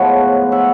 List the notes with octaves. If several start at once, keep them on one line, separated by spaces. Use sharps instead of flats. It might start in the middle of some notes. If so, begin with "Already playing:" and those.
Already playing: A2 F3 G#3 B3 B4 C#5
E5 F#5